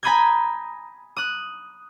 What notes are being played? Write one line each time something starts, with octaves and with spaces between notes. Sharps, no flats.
G#5 A#5 B5 D#6 G6 G#6
D#6 F#6